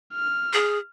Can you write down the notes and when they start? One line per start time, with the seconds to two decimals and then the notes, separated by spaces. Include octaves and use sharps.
0.14 F6
0.53 G#4